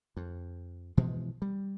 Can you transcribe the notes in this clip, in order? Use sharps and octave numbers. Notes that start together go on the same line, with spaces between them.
F2
B2 E3 F3 G#3
G3